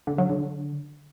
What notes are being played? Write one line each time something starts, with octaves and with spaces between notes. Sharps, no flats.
D3
F#3
D3